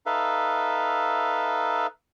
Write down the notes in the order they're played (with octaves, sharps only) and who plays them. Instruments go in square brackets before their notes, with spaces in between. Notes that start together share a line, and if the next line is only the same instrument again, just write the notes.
[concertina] D#4 A4 B4 E5 F5